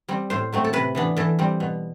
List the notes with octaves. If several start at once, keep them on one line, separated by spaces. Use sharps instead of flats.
G3 C4
A2 C5
F#3 A3 C4
A4
C3 B4
E3 B3 D4
E3 A4
G3 C4
B2